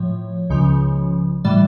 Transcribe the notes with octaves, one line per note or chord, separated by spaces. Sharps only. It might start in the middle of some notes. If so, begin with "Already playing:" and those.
Already playing: A2 F3 C#5
C#2 C#3 F3
A2 E3 G3 D5